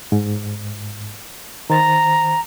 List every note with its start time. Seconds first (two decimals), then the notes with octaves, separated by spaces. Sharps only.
0.12 G#2
1.70 D#3 C5 A#5 A6